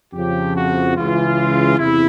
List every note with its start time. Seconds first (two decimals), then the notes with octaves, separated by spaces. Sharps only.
0.14 F2 C#3 F3 G4
0.55 F#4
0.96 C#2 C#3 E3 F4
1.78 E2 C3 E4